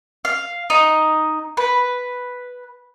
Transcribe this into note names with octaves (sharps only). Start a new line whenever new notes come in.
F5
D#4
B4